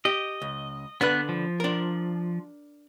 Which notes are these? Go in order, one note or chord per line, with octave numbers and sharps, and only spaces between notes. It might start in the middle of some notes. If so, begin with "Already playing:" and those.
G4 D#5
C#2
D3 B3 D4 B4 F#6
F3
D4 A#4